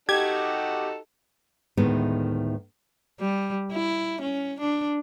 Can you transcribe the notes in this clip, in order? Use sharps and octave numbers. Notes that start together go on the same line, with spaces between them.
D#4 F#4 G4 A4 G#6
D2 A2 D#3 G#3 B3
G3
E4
C#4
D4